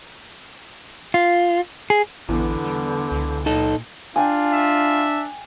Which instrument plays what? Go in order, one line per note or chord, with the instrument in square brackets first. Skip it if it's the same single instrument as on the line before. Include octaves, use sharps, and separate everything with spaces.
[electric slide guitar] F4
G#4
[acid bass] A1 [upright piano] E2 [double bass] D3 B3
[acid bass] G3
C#2
[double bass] A#2 [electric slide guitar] D#4 A4
[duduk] D4 [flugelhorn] F4 [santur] G5 G#5
[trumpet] E5